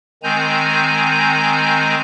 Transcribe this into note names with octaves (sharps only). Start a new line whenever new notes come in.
D#3 G#3 C4 G#5 A#5 G6